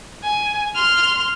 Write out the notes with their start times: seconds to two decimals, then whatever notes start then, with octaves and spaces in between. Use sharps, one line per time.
0.23 G#5
0.75 C6 F6